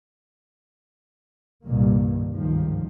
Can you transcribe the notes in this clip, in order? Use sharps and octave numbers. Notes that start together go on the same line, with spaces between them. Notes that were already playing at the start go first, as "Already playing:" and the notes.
C2 G2 A#2 D#3 A#3
G1 C#2 G#2 C3 D#3 F3